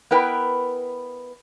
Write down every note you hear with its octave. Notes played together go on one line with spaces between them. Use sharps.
B3 E4 A#4 B4 G5